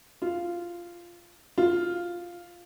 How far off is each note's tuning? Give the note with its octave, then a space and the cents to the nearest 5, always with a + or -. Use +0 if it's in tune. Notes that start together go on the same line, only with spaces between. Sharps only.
F4 -10
F4 +0